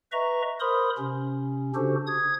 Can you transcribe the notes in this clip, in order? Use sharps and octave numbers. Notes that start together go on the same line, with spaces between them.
B4 D#5 E5 A#5 C#6
A#4 C5 B5 C6 D#6
C3 C#4
C#3 D4 F#4 G4 A4 C5
D#6 G#6